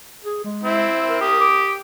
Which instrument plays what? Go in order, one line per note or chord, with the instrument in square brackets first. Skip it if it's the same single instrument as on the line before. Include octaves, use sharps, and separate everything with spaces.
[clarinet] G#4
G#3
[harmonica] C4 E4
[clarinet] A#4
[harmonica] G4 D#6
[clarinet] D6